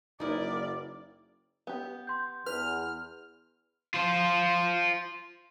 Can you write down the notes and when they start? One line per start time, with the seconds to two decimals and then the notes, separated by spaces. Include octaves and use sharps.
0.20 F#1 D#4 E4 A#4 D5
1.67 B3 G4
2.07 C6 G6
2.46 E2 B4 F6
3.94 F4 C5